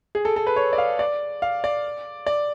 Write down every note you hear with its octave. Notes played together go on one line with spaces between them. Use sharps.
G#4
A4
A4
B4
C#5
D5
F5
D5
F5
D5
D5